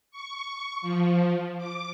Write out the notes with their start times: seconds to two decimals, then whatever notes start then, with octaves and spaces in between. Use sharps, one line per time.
0.11 C#6
0.82 F3
1.58 D6